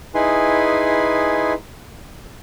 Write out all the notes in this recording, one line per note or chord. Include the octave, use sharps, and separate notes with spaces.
D#4 E4 G#4 B4 G#5 C6